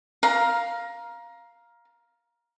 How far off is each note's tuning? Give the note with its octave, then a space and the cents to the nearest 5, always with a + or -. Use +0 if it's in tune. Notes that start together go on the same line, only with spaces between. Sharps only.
F5 +0 A#5 +20